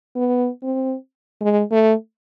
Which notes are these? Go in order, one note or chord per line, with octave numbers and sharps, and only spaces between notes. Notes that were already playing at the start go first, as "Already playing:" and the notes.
B3
C4
G#3
A3